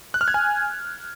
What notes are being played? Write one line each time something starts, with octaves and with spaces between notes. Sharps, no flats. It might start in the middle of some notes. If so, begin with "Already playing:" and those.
F#6
F6
G#6
G#5